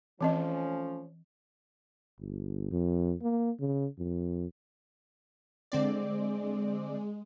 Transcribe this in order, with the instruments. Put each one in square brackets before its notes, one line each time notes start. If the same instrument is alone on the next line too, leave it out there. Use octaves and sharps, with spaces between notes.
[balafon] E3 C4 D#5 [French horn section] F3 A3 C#4
[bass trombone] G1
F2
A#3
C#3
F2
[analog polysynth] D3 C4 D5 [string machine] G#3